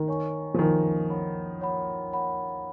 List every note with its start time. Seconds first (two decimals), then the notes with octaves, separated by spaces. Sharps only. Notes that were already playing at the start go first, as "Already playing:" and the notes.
Already playing: D#3
0.08 C#5 G#5 C#6
0.54 F3
0.59 D#3 C#5 G#5 C#6
1.10 C#5 F#5 B5
1.61 C#5 F#5 B5
2.12 C#5 F#5 B5